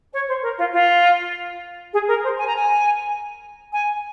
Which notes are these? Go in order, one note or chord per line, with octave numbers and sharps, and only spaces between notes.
C#5
C5
A#4
F4
F4
G#4
A#4
C5
G#5
A#5
G#5
G#5